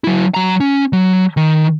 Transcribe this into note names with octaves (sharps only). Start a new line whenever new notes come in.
F#3 E4
F#3 A#5
C#4
F#3
D#3